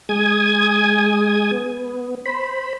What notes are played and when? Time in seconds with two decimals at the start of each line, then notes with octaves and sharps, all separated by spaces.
0.09 G#3 G#5 D#6 G#6
1.51 B3
2.25 C5 B5